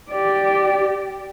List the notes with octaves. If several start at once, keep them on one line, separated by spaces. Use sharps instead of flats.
G4 D5